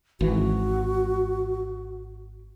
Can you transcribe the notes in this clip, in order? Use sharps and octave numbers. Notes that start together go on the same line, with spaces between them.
G#1 E3 F#4